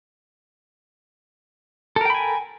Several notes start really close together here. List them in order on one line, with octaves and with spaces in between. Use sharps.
A4 A#4 G5 B5 G#5